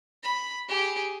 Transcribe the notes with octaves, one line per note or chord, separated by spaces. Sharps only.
B5
G4 G#4